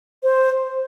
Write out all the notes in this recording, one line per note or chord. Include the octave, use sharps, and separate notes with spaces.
C5